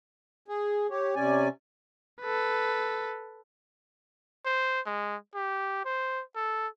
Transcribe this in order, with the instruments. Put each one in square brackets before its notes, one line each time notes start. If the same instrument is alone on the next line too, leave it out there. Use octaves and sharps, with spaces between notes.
[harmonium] G#4
G4 C#5
C3 C#4 D5 G#5
[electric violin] A4 B4
[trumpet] C5
G#3
G4
C5
A4